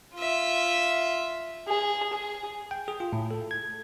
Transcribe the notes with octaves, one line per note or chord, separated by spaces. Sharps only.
F4 E5
G#4
G#4
G5
G#4
F4
A2
A4
G#6